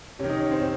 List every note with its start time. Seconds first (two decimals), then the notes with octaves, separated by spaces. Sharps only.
0.19 C3 D#3 C#4
0.30 D#4
0.40 C#4
0.51 C4
0.61 C3 D#3 C#4